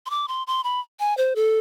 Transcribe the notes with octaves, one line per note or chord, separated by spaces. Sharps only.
C6
D6
C6
C6
B5
G#5
C5
A4